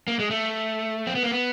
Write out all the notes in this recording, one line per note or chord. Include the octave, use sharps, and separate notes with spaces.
A#3
G#3
A3
C4
B3
A#3
B3